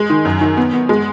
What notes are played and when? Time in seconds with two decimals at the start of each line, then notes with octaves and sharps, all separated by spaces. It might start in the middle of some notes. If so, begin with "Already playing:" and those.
Already playing: G#3
0.10 D#3
0.25 F#2
0.41 D#3
0.57 B3
0.73 B3
0.89 G#3